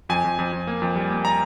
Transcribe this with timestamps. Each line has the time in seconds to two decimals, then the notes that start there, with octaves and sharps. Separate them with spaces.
0.09 F2 G#5
0.24 F2
0.39 F2
0.52 F2
0.67 A#3
0.82 F2
0.96 G3
1.10 A#3
1.25 A#5